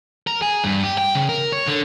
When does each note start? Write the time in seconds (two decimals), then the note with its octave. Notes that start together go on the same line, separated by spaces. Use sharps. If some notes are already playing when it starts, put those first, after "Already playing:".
0.27 A#4
0.42 G#4
0.64 G2
0.83 G4
0.98 G5
1.15 C#3
1.29 A#4
1.52 C#5
1.68 D3